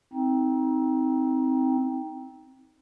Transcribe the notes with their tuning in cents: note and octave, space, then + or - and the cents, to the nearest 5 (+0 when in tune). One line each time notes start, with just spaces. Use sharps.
C4 +0 D#4 +20